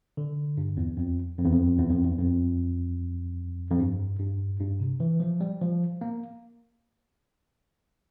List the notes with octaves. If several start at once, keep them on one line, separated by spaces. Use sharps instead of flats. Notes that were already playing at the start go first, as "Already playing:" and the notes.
D3
G2
E2
F2
F2
E2
F2
E2
F2
E2
F2
F2
G2
G2
G2
C3
E3
F3
G3
F3
A#3